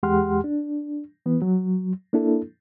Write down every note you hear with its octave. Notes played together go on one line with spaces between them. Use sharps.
E2 G#3 G4 F#5 C6 F6
D4
E3 B3 B4
F#3
A#3 D4 E4 A4